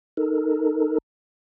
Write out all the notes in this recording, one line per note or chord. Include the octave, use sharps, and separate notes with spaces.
D#4 A4 A#4